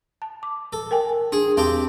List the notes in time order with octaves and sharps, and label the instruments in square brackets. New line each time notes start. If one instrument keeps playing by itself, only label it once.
[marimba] A5
D6
[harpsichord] A4
[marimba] A#4 G5 G#5
[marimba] D4 [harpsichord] G#4
[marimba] E2 A5 [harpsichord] C4 G4